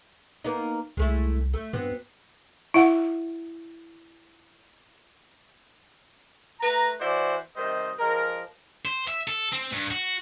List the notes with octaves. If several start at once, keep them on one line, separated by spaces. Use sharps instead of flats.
A#3 B3 D#4
C2 G#3 A3 E4
A3
G2 B3 C4 F#4
E4 E5 F#5
A3 B4 A#5
E3 E4 F#4 C5 D5
C3 D#3 G3 C5 D#5
F3 G#3 A#4
C5
E5
A4
C4
G2
F#4